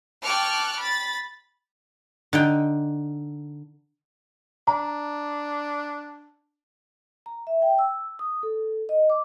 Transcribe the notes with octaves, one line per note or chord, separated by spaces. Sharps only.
G5 A5 C#6 D6 F6 F#6
B5 A6
D3 D#4 G5
D4 A#5
A#5
E5
G5
E6
D#6
A4
D#5
D6